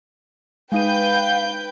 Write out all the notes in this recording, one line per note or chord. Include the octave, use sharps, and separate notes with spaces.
G#3 D#4 B4 F5 G5 G6 D#7